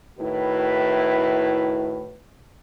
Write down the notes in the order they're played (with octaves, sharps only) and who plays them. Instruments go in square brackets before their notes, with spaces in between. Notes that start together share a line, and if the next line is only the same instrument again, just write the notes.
[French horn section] A2 D#3 E4 F#4 B4